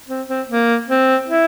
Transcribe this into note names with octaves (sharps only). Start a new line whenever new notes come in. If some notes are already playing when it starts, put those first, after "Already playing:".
C4
C4
A#3
C4
E4